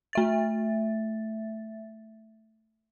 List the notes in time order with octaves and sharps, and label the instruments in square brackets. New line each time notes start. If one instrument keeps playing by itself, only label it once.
[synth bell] A3 E5 A6